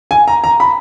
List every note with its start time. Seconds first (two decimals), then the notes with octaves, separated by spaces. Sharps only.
0.11 G#5
0.28 A#5
0.44 A#5
0.60 B5